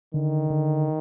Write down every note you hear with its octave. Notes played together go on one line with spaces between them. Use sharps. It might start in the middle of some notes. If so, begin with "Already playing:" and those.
D3 D#3
D3